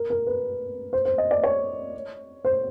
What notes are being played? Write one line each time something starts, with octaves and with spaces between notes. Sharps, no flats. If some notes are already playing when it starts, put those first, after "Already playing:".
Already playing: A#4
A#4
B4
C5
C5
D#5
D5
C#5
C5